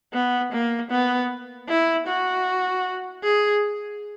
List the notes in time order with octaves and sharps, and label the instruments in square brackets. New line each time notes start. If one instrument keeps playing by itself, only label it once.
[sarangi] B3
A#3
B3
E4
F#4
G#4